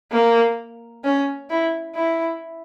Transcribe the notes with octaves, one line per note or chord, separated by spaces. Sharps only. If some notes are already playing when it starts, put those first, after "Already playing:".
A#3
C#4
E4
E4